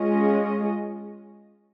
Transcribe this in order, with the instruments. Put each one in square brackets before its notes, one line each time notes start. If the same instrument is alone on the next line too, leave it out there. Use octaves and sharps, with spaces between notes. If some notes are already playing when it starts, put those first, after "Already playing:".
Already playing: [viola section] G#3 C#4 F4 G#4 D#5